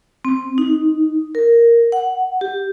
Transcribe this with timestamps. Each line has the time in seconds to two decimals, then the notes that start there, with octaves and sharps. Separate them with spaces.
0.25 C4
0.58 D#4
1.35 A#4
1.92 F#5
2.41 G4